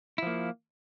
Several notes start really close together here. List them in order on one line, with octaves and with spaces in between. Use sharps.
E4 F3 A#3